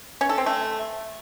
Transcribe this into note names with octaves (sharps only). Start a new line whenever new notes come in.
C#4
A4
C4
A3